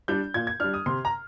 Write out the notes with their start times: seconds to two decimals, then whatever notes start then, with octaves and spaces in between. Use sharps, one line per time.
0.08 G3 D4 G6
0.34 A#2 G#6
0.47 G#6
0.60 G3 D4 F6
0.74 D#6
0.86 C3 C6
1.05 A#5